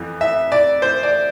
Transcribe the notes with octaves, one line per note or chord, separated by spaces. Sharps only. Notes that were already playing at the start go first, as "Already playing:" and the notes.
Already playing: F2 E3
E5
D5
C5
D5